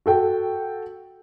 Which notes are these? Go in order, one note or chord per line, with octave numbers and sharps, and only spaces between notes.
F#4 A4 G5